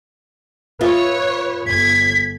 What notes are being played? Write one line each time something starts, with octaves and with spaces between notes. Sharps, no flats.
F4 B4 C#5 D#5 E5
G1 G#6 B6